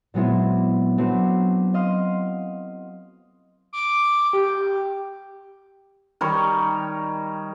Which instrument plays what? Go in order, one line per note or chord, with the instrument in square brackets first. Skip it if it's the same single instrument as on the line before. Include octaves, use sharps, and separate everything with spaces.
[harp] A#2 F#3 G#3 B3 C4 E4
F#3 A3 C4 D4 B4
D#5 F5 C6
[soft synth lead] D6
G4
[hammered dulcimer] D#3 G3 C#5